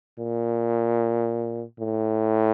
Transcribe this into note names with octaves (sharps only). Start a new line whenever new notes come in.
A#2
A2